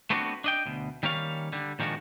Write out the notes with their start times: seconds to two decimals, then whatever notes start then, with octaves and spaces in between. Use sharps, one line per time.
0.10 A3 B3 C4 D4 F4 F#4
0.44 D4 D#5 G5
0.66 D2 B2
1.03 D#3 G3 A#3 C#4 C#5 F5
1.53 D3 G3
1.79 A#2 D#3 F3 G#3 D4 F#4